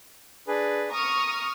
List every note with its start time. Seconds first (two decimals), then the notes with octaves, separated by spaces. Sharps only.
0.48 D4 G#4 B4
0.91 A#5 C#6 D#6 F6